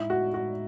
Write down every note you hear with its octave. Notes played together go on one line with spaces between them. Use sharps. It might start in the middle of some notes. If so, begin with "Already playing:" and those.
Already playing: A2 G#3 D#4 E4
F#4
F#4